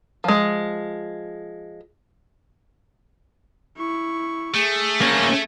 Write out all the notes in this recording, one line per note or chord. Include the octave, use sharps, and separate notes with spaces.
F3 G#3
E4 C#6
A3 G#4
A#3 C#4